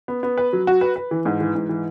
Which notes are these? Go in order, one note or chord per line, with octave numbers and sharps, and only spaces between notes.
B3
B3
B4
F#3
F#4
B4
B4
E3
G#2
E3
G#2
E3